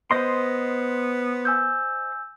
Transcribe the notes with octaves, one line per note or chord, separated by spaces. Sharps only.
B3 C5 D#5 C6
G#5 E6 G6